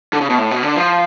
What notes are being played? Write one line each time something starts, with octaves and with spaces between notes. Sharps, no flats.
D3
C#3
B2
A2
B2
D3
F3